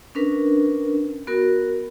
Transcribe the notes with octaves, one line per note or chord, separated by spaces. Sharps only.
C#4 D4 A#4 B4
B3 F#4 A#4